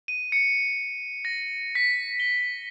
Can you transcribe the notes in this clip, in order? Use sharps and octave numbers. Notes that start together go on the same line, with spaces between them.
D#7
C#7
A#6
B6
G7